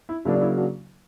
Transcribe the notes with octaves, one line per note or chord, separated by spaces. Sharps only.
E4
C#3 F#3 A#3 D4 E4
D4
E4
D4 F#4